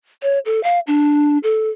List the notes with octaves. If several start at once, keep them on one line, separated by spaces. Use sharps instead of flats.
C#5
A4
F5
D4
A4